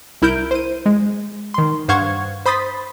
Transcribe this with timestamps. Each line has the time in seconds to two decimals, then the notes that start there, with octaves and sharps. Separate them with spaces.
0.22 C2 E4 A#4 G6 D7
0.51 C5 D#7
0.86 G#3
1.54 D#3 C6
1.88 G2 C5 F5 F#5 C#6 G#6
2.46 C5 B5 C6 D#6 A6 B6